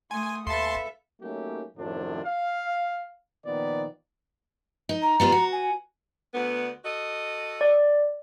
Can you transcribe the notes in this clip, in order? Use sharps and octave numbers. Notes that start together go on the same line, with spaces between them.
A3 G#5 C6 D#6
D#2 A4 B4 E5 F5 A5 C6
F#3 A3 A#3 C#4 D#4 G4
F#2 A2 C3 D#3 F3 D4
F5
A#2 D#3 F3 B3 D5
D#4
A#5
G3 B3 F4
F#4
G#5
D2 D3 B3
F#4 A4 D#5
D5